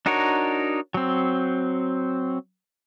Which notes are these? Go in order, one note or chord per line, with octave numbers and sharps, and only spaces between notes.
D4 D#4 F#4 A#4 C#5
F#3 C4